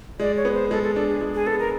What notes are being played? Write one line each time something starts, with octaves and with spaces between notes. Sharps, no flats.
G#3 D5
C#5
B3
C5
G#3 A4
A4
D4 A4
G#4
G#3
G#4
B3 A4
A#4